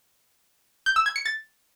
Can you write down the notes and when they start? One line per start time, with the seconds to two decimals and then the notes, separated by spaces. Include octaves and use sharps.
0.86 G6
0.96 E6
1.06 G#6
1.16 C#7
1.25 A6